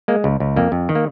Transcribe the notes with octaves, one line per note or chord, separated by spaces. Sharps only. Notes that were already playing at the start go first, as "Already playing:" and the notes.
G#3 A#3
C#2
C#2
F2 A#3
F2
D#3
A#3